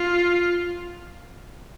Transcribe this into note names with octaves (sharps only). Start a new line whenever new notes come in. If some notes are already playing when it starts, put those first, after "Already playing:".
Already playing: F4